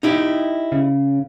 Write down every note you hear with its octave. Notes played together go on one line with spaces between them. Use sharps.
D#4 E4 G4
C#3